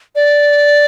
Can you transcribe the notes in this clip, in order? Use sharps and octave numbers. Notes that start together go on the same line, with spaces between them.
D5